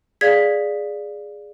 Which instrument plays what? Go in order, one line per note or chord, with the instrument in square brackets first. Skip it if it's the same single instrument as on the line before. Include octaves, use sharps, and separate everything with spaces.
[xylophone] G#4 D5 F5 G#6 B6